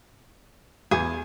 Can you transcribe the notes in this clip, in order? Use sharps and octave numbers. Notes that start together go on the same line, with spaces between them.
E2 G#4